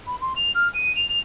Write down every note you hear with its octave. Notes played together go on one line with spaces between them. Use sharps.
B5
C6
F7
F6
D#7
F7
F7